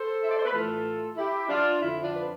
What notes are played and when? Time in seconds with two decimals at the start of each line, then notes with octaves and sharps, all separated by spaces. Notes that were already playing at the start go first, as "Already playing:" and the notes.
Already playing: A4 C5
0.23 E5
0.31 D5
0.39 C5
0.45 B4
0.52 A2 E3 A3 F4 A4
1.17 E4 G4
1.49 D4 F4
1.82 F2 D3 F3 E4
2.03 D4 F4
2.15 B4